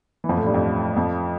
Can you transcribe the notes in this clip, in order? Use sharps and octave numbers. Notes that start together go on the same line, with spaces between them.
E3
F2 F3
A2 A3
G2 G3
F2 F3
F2 F3